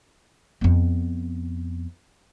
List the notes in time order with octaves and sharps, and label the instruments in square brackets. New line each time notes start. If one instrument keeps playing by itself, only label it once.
[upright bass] F2 B3